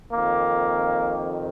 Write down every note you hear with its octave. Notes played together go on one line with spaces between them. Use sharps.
F2 D#3 A#3